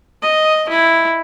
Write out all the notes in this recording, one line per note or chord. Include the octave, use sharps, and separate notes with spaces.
D#5
E4